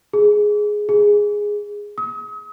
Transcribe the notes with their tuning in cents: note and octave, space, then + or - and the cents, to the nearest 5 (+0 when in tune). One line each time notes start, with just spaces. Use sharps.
G#4 +5
G#4 -5
D#6 +45